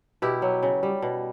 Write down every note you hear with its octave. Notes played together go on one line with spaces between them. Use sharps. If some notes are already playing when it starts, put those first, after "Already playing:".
B2 E4 G4
F#3
C#3
G3
B2